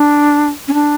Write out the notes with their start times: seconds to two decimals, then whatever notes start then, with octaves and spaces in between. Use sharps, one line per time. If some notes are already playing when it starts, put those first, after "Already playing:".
Already playing: D4
0.68 C#4
0.74 D4